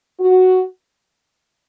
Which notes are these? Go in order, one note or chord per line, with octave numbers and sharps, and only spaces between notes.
F#4